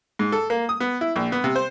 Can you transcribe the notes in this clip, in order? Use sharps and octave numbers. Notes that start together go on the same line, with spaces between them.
G#2
A4
A#3
D#6
B3
E4
A#1
B3
C3
C5